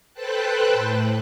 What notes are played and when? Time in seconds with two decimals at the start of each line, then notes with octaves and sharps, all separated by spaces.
0.14 A4 B4 C5 G5 A5 F#6
0.72 A2